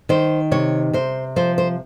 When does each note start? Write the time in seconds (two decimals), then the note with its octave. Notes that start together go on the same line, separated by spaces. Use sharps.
0.09 D#3 C5
0.51 C3 C#5
0.93 C3 C5
1.36 F3 C5
1.58 C5